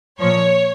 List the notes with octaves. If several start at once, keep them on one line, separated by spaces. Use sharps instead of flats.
A#2 F3 C#5